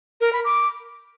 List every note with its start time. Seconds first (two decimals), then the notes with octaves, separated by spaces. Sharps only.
0.21 A#4
0.33 B5
0.45 D6